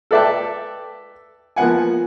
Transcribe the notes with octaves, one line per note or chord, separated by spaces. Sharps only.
A4 B4 D5 E5 G5 A5
F3 A#3 B3 F#5 G#5